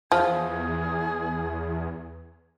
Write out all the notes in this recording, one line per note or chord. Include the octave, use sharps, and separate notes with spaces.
E2 F3 G#4